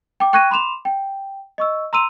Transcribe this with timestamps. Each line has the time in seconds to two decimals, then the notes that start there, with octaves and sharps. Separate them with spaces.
0.20 G5 D6
0.33 G5 C#6 F#6 G#6 A#6 D#7
0.50 B5 C6 D6 E7 F7
0.85 G5
1.58 D#5 C#6 E6
1.93 A#5 C6 E6 D#7 F7